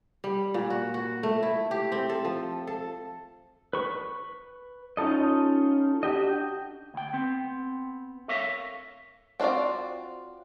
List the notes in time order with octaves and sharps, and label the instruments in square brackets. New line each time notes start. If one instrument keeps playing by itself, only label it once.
[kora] G3
A#2
F#4
F#4
A3
E4
G4
C4
A4
F3
A4
[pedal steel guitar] B4 C#6
C#4 D#4 F4 A4 D#5
D4 F#4 G4 D#5
[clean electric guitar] D2 G5
B3 C4
A4 A#4 C#5 E5 F5
[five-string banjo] C4 D4 F4 F#4 D5